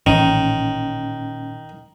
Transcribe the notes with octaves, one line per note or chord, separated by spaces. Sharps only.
A1 A#2 D#3 C#4